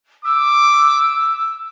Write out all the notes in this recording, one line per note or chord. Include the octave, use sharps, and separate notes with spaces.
D6 E6